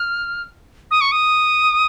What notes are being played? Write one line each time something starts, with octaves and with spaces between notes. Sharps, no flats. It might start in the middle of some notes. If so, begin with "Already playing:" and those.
Already playing: F6
D#6
C#6
D#6